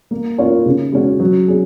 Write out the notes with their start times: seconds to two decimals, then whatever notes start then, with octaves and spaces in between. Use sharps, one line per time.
0.11 A#3
0.38 C#4 F4 A#4 C#5
0.66 C#3
0.92 G#3 C#4 F#4
1.20 F#3
1.48 C#4 G#4